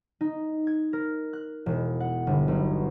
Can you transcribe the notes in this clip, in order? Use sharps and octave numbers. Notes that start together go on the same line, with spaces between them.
D#4
G#6
A#4
F#6
E1
F#5
G1
B1